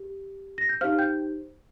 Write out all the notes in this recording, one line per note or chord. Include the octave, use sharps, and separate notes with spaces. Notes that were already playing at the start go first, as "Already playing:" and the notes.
Already playing: G4
A#6
G6
D#4 G4 C5 F5 F6
G5 G6